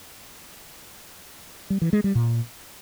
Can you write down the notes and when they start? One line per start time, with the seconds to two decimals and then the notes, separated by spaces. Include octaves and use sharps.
1.70 G3
1.82 E3
1.93 G#3
2.04 G3
2.15 A#2